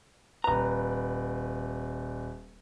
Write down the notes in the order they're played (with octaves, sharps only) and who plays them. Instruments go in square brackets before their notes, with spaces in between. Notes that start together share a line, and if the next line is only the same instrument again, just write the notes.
[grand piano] D#1 B4 [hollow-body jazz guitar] A#5